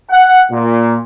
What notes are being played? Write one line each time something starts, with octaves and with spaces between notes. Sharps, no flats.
F#5
A#2